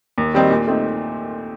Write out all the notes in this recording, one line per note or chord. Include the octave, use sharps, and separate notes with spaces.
D#2
D#3 G3 C4 D#4
A#2
A3 C4 D#4